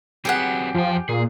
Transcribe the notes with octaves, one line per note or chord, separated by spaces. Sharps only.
F#3 C4 G4 G#4 B4 F#5
F2 F3 G5
A#2 G#4